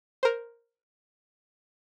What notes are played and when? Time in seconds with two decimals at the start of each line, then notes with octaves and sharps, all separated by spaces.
0.23 A#4 C5